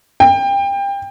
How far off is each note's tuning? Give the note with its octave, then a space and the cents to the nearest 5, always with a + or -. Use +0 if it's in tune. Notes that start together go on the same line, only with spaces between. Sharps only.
G5 +25